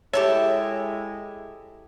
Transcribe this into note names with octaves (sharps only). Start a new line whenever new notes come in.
G#3 E4 G4 A4 C#5 E5